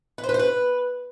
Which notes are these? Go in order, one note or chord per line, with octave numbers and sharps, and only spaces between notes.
B4
C5
B4
C5
B4